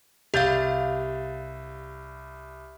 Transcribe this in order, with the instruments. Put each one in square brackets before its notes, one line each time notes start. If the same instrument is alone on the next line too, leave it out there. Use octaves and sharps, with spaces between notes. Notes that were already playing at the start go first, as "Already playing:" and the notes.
[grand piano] C2 G6 A6 [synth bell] G4 F5